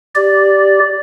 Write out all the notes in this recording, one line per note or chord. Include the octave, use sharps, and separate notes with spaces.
G4 D5